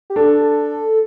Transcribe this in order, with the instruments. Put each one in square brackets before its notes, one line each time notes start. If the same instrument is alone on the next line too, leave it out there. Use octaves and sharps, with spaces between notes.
[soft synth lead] G4
[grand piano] D4 [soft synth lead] A4